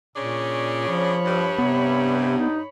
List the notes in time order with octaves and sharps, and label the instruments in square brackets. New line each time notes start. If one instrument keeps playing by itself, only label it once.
[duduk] A#2 [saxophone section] C#3 C#4 D4
[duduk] F3 [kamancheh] C#5 B5
[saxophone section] G2
[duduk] C3 [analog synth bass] B3
[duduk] D#4